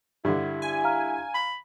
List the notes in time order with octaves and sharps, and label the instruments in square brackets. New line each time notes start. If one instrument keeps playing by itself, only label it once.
[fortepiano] G2 D3 [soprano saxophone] E4
[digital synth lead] G#5
[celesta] F5 A#5 F6
[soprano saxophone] B5